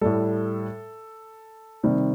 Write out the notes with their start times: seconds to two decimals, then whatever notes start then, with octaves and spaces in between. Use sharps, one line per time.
0.01 A2 G3 A4
1.83 C3 D#3 G3